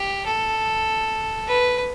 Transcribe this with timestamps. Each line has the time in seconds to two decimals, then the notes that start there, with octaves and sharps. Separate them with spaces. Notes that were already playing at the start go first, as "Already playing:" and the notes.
Already playing: G4
0.26 A4
1.47 B4